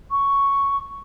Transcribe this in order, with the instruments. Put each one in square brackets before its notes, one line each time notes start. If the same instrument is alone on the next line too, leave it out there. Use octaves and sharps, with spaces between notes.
[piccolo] C#6